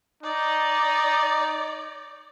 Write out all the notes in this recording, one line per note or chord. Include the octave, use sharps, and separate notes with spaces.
D#4 D5